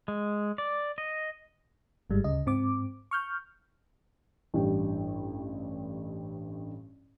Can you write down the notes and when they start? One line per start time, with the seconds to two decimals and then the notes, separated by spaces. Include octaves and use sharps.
0.08 G#3
0.58 D5
0.98 D#5
2.10 G1 G#2 G3 G#3
2.24 D2 C#3 D#5
2.46 G#2 C4 D6
3.11 C#6 F6 G6
4.54 A1 G2 G3 G5